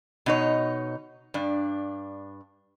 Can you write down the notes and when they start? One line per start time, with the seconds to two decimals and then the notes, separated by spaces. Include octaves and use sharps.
0.26 B2 D#4 C#5
1.34 G2 D4